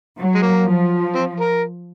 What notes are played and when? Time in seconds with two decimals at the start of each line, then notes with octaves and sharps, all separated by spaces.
0.18 F#3
0.35 G#3
0.42 A#3
0.67 F3
1.15 C4
1.40 A#4